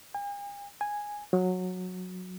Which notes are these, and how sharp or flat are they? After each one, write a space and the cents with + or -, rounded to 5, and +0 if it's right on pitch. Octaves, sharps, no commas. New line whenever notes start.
G#5 -45
G#5 -5
F#3 -15